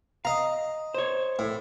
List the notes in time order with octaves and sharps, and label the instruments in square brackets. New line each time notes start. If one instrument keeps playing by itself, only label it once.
[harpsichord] D#5 A#5 [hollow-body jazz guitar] F5
[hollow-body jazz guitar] C5 C#5
[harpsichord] A2